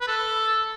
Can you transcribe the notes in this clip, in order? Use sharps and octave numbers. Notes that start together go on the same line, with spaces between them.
B4
A4